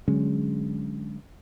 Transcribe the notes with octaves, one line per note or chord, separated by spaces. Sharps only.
D3 F#3 G#3 C#4